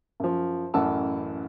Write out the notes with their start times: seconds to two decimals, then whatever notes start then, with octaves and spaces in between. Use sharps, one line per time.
0.20 F#2 F3
0.74 A1 F#2 E3 F#5 A5 E6